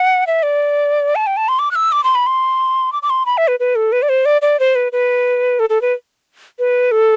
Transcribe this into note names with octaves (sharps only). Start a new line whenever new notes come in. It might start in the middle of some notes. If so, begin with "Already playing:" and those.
Already playing: F#5
E5
D5
A5
G5
A5
C6
D6
F#6
E6
D6
C6
B5
C6
D6
D6
C6
B5
E5
B4
B4
A4
B4
D5
C5
D5
D5
C5
B4
B4
A4
A4
B4
B4
A4